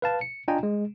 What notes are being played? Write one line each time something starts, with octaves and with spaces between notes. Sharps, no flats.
B4 F5 A5
C#7
D4 F4 D#5 G5 G#5 A#5
G#3